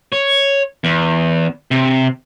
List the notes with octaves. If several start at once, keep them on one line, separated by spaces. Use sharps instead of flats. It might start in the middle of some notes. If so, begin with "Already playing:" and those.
C#5
E2
C3